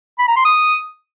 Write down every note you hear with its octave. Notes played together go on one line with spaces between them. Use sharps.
B5
A#5
C6
D#6